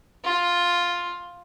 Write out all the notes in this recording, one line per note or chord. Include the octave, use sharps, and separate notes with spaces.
F4